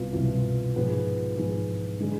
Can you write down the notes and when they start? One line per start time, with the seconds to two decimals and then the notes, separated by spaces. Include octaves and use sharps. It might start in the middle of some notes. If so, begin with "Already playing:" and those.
Already playing: C2 B2 B3 F4
0.13 C2 B2 B3 F4
0.75 G#2 F3 B3 F4 G#4
1.37 G#2 F3 B3 F4 G#4
2.00 D3 G#3 D4 G#4